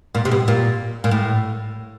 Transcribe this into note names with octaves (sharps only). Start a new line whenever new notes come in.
A#2
C3
B2
A#2
A#2
A2